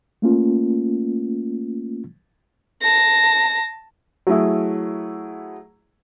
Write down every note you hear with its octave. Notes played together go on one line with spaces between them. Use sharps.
A3 A#3 C#4 F4
A5 A#6
F#3 A3 E4 G#4